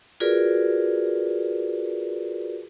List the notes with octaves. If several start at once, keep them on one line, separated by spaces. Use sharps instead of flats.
F4 F#4 G#4 A#4 B4 D5